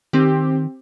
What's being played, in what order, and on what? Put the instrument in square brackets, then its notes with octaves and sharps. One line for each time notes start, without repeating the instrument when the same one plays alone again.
[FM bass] D#3 [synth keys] C4 G4